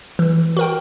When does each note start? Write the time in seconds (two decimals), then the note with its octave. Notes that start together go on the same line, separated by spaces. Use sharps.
0.19 E3
0.57 F#4 A#4 G5